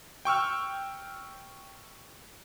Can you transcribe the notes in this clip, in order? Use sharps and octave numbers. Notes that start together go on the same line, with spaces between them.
G5 C#6 E6 F6